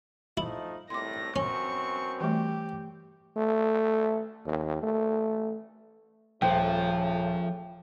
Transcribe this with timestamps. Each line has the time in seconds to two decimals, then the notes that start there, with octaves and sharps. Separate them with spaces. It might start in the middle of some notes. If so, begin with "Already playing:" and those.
0.37 F3 A3 D#4 E4
0.90 C2 A2 C6 D6 A#6
1.36 F#2 B2 C4 C#4 C#6
2.21 E3 G3 A3 G4
3.37 A3
4.45 D#2
4.83 A3
6.42 D#1 A2 C#3 F3 A3 C5 G5